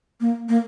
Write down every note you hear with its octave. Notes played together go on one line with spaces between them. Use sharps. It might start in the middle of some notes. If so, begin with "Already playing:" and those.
A#3
A#3